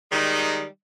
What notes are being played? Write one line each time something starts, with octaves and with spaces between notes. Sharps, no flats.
D#3 G3 G#3 D#4